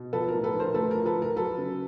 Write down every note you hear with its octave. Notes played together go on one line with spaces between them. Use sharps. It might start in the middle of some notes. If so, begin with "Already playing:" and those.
Already playing: B2
F3 A4 B4
A#4
A2
A4 B4
A#1
A#4 C5
A3 A4 B4
A#4
F3
A4 B4
A2
A#4
F#3 A4 B4
C#3